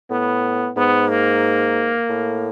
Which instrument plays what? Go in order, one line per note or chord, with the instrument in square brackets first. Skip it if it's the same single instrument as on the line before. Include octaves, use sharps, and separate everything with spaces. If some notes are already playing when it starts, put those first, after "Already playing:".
[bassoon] A2 [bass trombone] B3
[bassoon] G#2 [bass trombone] B3
[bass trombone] A#3
[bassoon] A2